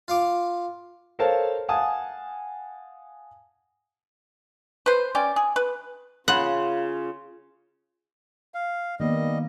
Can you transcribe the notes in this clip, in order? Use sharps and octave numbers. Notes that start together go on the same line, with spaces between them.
F4 F5 D6
A4 A#4 C5 C#5 F5 A5
F5 F#5 G#5 A5 D#6
B4 C5
C#4 G4 D5
G#4
B4
C#3 F4 F#5 B5 C6
F5
D#3 G3 A#3 B3 D#5